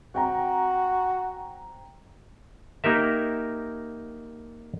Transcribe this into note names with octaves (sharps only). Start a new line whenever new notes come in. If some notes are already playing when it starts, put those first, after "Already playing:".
C4 F#4 G5 A#5
A#3 D#4 G4 A#4 E5